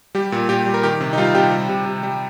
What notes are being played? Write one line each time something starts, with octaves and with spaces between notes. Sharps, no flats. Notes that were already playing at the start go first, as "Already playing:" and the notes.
G3 G4
A#2
A#2 G4
G3
A#4
D#3 G4
C3
D#4
G3 F4
C3 G4
G3
C3
C3
G3